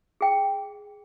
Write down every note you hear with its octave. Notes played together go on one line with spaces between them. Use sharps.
G#4 G5